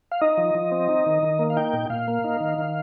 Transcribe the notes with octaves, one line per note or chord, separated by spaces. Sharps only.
F5
D#4 D#5
F3
F3
C4
D#4
D#3
D#3
A#3
F5
D#4 G5
A#2
A#2 F5
A#3
D#4
D#3
D#3